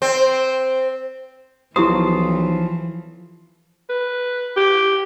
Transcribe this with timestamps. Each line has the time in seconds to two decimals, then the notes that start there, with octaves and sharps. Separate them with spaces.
0.02 C4
1.76 B1 E3 F3 E4 F4 G4 C5 D#6
3.89 B4
4.56 G4